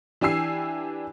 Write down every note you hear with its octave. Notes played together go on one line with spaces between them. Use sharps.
E3 D4 G4 G#5 E6 C7